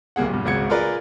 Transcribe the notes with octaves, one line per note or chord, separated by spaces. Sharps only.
D1 C2 A#3 G#4 F#5
G2 A#2
G#1 C#2 F#4 G#6 C#7
F4 G#4 A#4 B4 D5